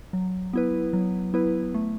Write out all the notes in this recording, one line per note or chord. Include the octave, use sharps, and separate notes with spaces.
F#3
B3 E4 B4
F#3
B3 E4 B4
A3